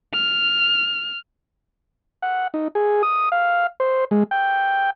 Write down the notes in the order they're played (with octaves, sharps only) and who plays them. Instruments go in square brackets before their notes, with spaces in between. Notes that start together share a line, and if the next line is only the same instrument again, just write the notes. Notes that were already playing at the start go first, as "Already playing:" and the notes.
[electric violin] F6
[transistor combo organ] F#5
D#4
G#4
D#6
F5
C5
G#3
G5